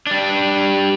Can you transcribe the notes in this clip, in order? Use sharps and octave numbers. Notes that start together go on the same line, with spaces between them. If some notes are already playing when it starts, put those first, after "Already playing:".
G3 D4